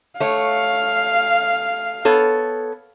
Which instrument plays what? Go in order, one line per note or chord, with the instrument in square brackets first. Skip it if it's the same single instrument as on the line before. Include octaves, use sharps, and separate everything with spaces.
[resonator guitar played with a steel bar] A3 C#5 [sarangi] F5
[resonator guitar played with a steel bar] B3 A4 C#5